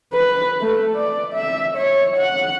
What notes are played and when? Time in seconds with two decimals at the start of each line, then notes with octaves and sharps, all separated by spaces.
0.13 B4
0.61 A3
0.96 D5
1.33 E5
1.76 C#5
2.17 F#5